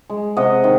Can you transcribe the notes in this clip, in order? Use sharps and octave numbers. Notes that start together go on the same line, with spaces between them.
G#3
C3 D#5 F#5
D#3